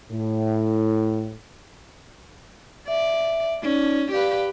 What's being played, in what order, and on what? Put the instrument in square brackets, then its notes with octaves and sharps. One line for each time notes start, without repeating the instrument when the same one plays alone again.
[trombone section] A2
[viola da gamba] D5 [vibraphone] E5
[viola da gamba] C#4 [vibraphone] D#4 D5
[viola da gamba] G4 B4 [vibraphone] D5 F5